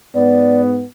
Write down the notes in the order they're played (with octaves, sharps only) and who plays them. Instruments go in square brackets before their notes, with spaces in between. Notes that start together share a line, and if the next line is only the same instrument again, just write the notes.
[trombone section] G#2 B3 [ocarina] D5